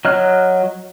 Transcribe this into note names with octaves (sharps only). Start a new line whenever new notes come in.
F#3 D#5 F6 F#6